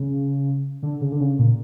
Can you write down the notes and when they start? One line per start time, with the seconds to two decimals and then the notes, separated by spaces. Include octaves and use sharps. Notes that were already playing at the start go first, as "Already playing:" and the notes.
Already playing: C#3
0.83 D3
1.01 C#3
1.12 D3
1.20 C#3
1.39 A#2